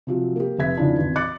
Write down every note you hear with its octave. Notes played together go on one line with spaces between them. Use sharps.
C3 F3 F#3
A#3 G4
F1 B4 E5 G#6 B6
F2 C#3 E3 D4 D#4
G#1 E2
D#5 D6 F#6 A6 C#7